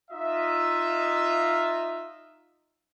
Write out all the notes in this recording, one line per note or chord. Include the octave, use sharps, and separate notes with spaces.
D#4 F4 D#5 E5